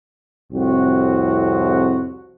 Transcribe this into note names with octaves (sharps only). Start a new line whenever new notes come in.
C2 F2 A2 C4 F#4